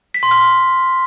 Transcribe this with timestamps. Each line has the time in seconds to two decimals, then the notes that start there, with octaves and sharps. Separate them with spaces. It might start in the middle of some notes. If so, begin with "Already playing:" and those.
0.14 B6
0.23 C6
0.31 F6